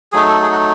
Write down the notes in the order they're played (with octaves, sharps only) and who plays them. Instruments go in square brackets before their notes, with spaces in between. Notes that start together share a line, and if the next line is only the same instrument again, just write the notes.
[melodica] F#3 A3 D#4 G#4
A4
G#4
F#4